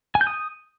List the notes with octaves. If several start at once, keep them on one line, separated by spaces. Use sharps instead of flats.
G#5
G6
D#6